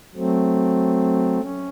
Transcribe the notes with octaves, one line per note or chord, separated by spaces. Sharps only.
F#3 A3 C4
C#4